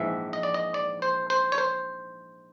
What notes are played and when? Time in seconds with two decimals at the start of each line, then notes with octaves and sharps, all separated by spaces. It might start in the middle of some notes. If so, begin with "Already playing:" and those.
Already playing: A#1 G#2 E3 E5
0.33 D#5
0.43 D5
0.54 D#5
0.74 D5
1.02 C5
1.30 C5
1.52 C#5
1.58 C5